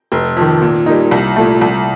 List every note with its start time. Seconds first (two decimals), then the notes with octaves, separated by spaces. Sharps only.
0.12 F1
0.37 F2 D#3
0.62 A#2
0.86 G3 A#3 D#4
1.11 C2
1.36 A#2 A3
1.61 C2